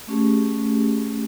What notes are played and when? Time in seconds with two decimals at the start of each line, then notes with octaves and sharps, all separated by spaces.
0.07 A3 C#4 G4 G#4